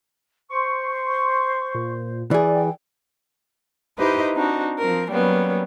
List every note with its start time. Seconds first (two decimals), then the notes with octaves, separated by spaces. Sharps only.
0.51 C5 C6 C#6
1.75 A#2
2.31 E3 G#4 D5
2.54 G5
3.98 D#4 E4 G4 B4 C5 D#5
4.35 C4 D4 D#4 F#4
4.79 F3 C4 A#4
5.10 F#3 G3 A#3 B3 C#4